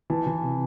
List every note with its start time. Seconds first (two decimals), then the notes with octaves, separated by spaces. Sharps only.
0.10 E3 A5
0.27 E3
0.43 C3